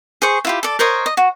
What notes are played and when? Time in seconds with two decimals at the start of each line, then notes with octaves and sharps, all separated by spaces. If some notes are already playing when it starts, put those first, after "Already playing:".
0.22 G#4 C5 C#6
0.45 E4 F4 G4
0.63 A4 D5
0.79 A#4 C5 C#5 D#5
1.06 D#5
1.17 F#4